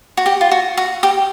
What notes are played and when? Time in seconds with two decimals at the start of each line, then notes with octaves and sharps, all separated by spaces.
0.17 F#4
0.26 G4
0.41 F4
0.51 F#4
0.77 F#4
1.03 G4